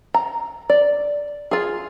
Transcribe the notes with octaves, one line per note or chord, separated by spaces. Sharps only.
A#5
D5
F4 G#4